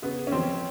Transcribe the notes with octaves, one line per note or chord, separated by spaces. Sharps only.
C#3 B3
C#4
F3 C4